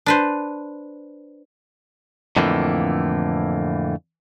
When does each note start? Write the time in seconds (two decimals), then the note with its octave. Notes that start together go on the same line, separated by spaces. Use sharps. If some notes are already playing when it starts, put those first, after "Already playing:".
0.06 D4 B4 C5
2.36 F2 A2 D3 E3 A3 A#3